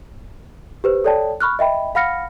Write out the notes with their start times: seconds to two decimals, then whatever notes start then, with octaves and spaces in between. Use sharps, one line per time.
0.84 G4 B4 C5
1.04 A4 C#5 D5 G5 A5
1.41 B5 C#6 F6 F#6
1.59 D#5 E5 G5 B5
1.95 F5 F#5 B5 F6 A#6 C#7